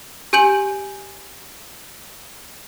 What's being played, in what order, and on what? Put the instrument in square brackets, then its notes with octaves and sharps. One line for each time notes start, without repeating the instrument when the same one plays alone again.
[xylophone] G4 G#5 G6 D7 F#7